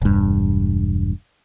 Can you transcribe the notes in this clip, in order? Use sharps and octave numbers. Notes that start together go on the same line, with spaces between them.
E1 G2